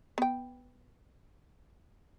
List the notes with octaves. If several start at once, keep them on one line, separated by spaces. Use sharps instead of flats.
B3 G5